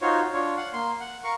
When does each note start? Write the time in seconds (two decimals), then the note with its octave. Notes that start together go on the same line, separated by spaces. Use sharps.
0.01 D#4 F4 F#4 C5 C#5
0.33 D4 F4 C#5
0.57 F5 F#5
0.73 A#3 C6
1.00 F#5
1.24 A#4 F5 C#6